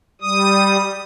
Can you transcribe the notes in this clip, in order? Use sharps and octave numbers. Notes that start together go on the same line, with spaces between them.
G3 D#6